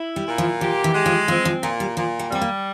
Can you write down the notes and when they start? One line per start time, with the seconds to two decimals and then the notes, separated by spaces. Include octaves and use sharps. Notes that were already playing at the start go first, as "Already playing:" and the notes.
Already playing: E4
0.16 G3
0.27 A#2
0.38 F3
0.61 F3 G4
0.84 E3
0.94 G#3
1.06 F3
1.28 F3 C4
1.45 F3
1.63 A#2 F3
1.80 G3
1.97 A#2 F3
2.19 G3
2.31 G3 C4
2.42 A#3